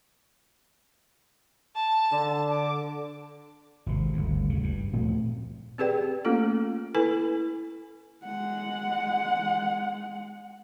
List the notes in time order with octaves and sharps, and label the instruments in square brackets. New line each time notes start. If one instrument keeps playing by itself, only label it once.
[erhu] A5
[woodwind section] D3
[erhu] D6
[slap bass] G#1 C3
G1 D2
D2 C#3
G2
A#2 F3 A3 C4
[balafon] C4 G4 G#4 B4 D5 G5
A3 A#3 C#4 F4 A4
E4 A4 B4 G#5
[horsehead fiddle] G#3 F#5